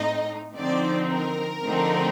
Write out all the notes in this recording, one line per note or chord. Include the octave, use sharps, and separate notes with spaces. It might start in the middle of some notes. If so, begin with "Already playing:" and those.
Already playing: A2 A3 C4 D#4 D#5
D3 F3 C4 D#4 D5
A#4
D3 F3 A3 C4 D#4